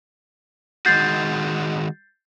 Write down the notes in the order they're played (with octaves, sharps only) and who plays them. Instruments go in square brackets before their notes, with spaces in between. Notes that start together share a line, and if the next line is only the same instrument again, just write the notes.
[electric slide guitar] D#3 G#3 F#4 [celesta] G6 A6 C7